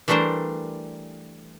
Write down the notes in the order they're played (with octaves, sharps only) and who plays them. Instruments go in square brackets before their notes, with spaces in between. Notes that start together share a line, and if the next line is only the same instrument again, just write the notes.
[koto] E3 G3 A3 D4 A#4 C5